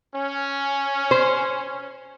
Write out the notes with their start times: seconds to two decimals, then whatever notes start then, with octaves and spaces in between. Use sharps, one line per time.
0.15 C#4
1.11 C5